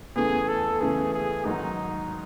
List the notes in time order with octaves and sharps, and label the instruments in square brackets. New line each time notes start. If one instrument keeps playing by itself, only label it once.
[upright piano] E2 C#3 E3 A3 [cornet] G#4
[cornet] A4
[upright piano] E2 C#3 E3 A3 [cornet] G#4
[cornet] G#4
[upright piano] G#2 D#3 F#3 [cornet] D#4